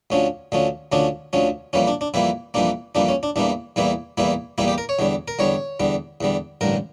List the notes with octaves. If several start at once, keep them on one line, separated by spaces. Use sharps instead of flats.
D2 D3 F3 C#4
D2 D3 F3 C#4
D2 D3 F3 C#4 D4
D2 D3 F3 C#4
F2 E3 G3 A#3 C#4
D4
D4
F2 E3 G3 A#3 E4
F2 E3 G3 A#3 D4
F2 E3 G3 A#3 D4
C#4
D4
E2 E3 G3 A#3 D4
E2 E3 G3 A#3 E4
E2 E3 G3 A#3 E4
E2 E3 G3 A#3 E4
G4
A#4
C#5
E2 D3 G3
A#4
E2 D3 G3 C#5
E2 D3 G3
E2 D3 G3
A1 G2 D3 A#4